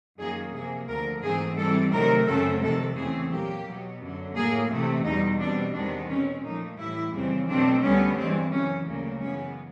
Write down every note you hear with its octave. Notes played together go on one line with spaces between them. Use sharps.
F#2 D#3 F#3 A#3 G#4
C3 F3 A#3 G#4
D2 D3 F3 A#4
G#2 E3 A3 C4 G#4
G#2 E3 G3 C4 A4
C3 D#3 F#3 A3 A#4
F#2 C#3 F#3 A3 C4 A4
F2 C3 D#3 G#3 A4
E2 C#3 E3 A3 C4 G#4
A#2 F#3 A#3 G4
B2 F#3 B3
F#2 D3 F#3
A2 F#3 A#3 G#4
C3 E3 A3
E2 B2 G3 D#4
B2 G3 C4 D4
E2 C3 D#3 G#3 B3 D4
B2 G#3 C4 C#4
A#2 F3 A3 D#4
A2 E3 G3 E4
F2 C#3 E3 G3 C4
B2 F#3 A3 C4 D4
D2 D3 G3 B3 C#4
G2 E3 G#3 C4
F#2 C#3 E3 C#4
D2 C#3 F#3 A#3
F#2 C#3 E3 G#3 B3 C#4